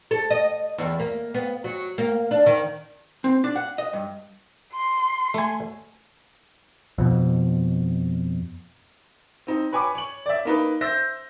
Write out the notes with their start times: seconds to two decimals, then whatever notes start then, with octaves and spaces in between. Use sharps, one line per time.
0.11 A4
0.30 D#5
0.78 E2
1.00 A#3
1.34 B3
1.64 F#3
1.98 A#3
2.31 D4
2.46 D#3
3.24 C4
3.44 D4
3.56 F#5
3.78 D#5
3.93 G2
4.73 C6
5.34 A3 G#5
6.98 F2 B2
9.47 C4 D#4
9.72 B4 C#5 G#5 B5 D6
9.95 C#5 F#7
10.26 D5 E5
10.45 A#3 D#4 B4
10.81 C5 E5 E6 G6 A#6